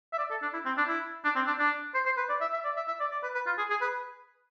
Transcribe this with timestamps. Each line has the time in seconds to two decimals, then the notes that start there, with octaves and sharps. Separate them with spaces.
0.13 E5
0.18 D5
0.31 A4
0.42 D4
0.53 E4
0.65 C4
0.77 D4
0.88 E4
1.24 D4
1.35 C4
1.47 D4
1.59 D4
1.94 C5
2.05 C5
2.17 B4
2.29 D5
2.41 E5
2.53 E5
2.65 D5
2.76 E5
2.87 E5
3.00 D5
3.12 D5
3.23 B4
3.35 B4
3.46 F4
3.58 G#4
3.70 G#4
3.81 B4